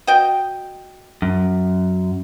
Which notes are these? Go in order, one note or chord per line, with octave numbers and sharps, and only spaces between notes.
F#4 D#5 G5
F#2